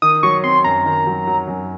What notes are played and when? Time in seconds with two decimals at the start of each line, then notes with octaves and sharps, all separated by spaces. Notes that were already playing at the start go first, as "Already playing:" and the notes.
0.02 D#3 D#6
0.23 F#3 C#6
0.44 C4 C6
0.64 F#2 A#5
0.85 D#3
1.07 F#3
1.27 F#3
1.48 F#2